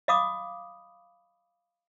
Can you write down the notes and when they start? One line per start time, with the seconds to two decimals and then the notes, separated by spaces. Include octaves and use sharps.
0.08 D#5 F5 B5 D6 D#6